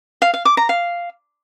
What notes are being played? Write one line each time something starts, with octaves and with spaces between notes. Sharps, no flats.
F5
F5
D6
A#5
F5